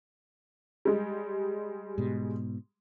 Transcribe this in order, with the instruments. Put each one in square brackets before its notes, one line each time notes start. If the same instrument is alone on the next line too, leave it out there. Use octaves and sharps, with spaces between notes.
[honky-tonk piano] G3 G#3
[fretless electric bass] G#2 B2